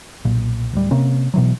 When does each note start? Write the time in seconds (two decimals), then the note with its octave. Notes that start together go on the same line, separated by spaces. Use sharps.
0.25 B1 A#2
0.73 D1 G3
0.91 C3 A#3 C#4
1.34 B2 E3 F#3